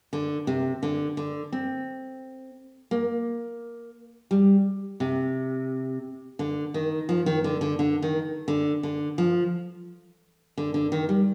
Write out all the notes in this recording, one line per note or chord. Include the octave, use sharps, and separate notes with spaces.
D3
C3
D3
D3
C4
A#3
G3
C3
D3
D#3
F3
D#3
D3
D3
D3
D#3
D3
D3
F3
D3
D3
D#3
G3